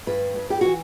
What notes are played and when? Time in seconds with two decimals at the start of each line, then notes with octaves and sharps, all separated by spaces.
0.07 G2 B4
0.36 G2
0.50 G4
0.61 E3 F#4